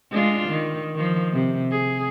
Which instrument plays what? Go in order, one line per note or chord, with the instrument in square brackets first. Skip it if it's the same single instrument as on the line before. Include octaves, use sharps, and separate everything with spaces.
[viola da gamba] G#3 D4 F4
D#3
D#3 F3
C3
G#4